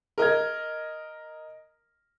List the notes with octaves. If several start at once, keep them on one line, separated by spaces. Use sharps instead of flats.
A#4 D#5 F6 G#6